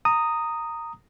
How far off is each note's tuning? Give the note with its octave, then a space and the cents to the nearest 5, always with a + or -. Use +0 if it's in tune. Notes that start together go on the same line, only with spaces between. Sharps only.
A#5 -15 D#6 +0